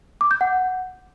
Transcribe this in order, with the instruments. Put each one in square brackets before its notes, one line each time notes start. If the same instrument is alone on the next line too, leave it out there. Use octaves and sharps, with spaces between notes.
[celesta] D6
G6
F#5